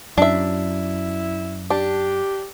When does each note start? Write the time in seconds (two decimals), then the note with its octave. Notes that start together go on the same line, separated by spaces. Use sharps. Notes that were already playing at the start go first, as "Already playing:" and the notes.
0.18 F#2 D4 E4 E5
1.70 D4 G4